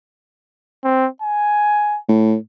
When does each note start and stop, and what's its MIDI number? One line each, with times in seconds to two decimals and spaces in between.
0.84 1.07 60
1.22 1.99 80
2.08 2.35 45